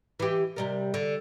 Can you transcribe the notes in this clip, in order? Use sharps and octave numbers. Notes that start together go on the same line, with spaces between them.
E3 G4
C3 G3 A#4
D3